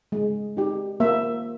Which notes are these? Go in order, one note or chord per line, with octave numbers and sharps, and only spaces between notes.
G#3
D#4 G4
A#3 E5